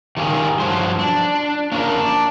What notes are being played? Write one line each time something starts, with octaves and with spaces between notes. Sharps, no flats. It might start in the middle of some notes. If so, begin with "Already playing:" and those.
D#3 G3 F4 G#4
G2 F3 F#3 C5
D4
A#3 C#4 D4 F4 G#4 A#4
D4